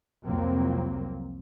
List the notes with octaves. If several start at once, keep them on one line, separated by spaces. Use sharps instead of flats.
C2 F2 F#3 A#3 C4